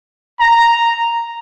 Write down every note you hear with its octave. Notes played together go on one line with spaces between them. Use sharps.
A#5